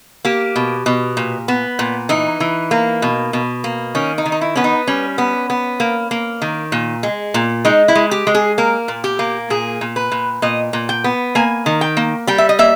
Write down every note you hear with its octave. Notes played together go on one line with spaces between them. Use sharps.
A#3 G4
B2
B2
A#2
B3
A#2
E3 D#4
E3
A#3
B2
B2
A#3
D#3 C#4
D#4
D#3
D#4
E4
B3 C#4
D#4
G3 C#4
B3
B3
A#3
A#3
D#3
A#2
G#3
A#2
G#3 D#4
E4
G#3
G4
G#3
G#4
A#3 A#4
A#2
G4
A#3
A#2 G#4
A#2
B4
A#2
A#2 D#5
A#2
G5
B3
A#3 G#5
D#3
G5
A#3
G3 G5
E5
D#5
A#3 E5